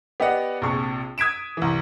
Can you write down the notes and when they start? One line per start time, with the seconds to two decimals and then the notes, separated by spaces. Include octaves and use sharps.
0.20 B3 G4 D5 D#5 F#5
0.62 A#1 C3 G#4 C#6
1.18 D#6 G#6 B6 D7 E7
1.57 C2 E3